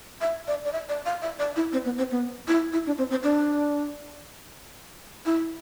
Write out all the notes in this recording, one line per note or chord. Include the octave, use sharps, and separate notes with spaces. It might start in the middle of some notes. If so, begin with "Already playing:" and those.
E5
D5
D5
E5
D5
F5
E5
D5
E4
C4
B3
C4
B3
E4
E4
D4
C4
C4
D4
E4